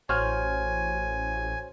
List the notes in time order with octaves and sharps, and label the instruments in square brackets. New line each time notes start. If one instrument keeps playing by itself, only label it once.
[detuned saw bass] A1 [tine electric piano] F#4 C5 C#5 [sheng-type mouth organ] G#5 [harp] F6